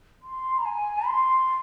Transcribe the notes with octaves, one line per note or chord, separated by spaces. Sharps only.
C6
A#5
G#5
C6